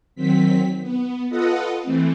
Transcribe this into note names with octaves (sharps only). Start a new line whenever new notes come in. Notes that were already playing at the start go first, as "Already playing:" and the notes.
D#3 F#3 C4 B6
B3
F4 A4 B4 D#5 F#5 D#6
E3 A3 C4